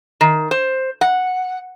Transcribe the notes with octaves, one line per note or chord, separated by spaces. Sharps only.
D#3
C5
F#5